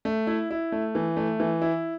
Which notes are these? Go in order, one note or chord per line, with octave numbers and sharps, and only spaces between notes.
A3
E4
E4
A3
E3
A3
E3
E4